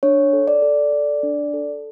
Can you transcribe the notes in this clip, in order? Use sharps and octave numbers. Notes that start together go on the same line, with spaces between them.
D4 C#5
A4
D5
A4
A4
D4
A4